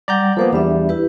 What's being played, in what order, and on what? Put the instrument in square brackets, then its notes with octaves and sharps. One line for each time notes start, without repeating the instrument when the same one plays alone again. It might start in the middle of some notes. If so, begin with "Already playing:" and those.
[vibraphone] G3 F#5 G5 [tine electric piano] D5 A#5 G6
[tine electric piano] F3 A#3 B3 [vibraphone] A4 C5 F#5
[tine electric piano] E2 G3 [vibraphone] D4 E5
[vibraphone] E4 G4 B4